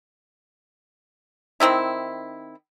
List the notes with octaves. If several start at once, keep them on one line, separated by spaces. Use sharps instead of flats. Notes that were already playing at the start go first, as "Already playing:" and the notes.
D#3 C4 D#4 E4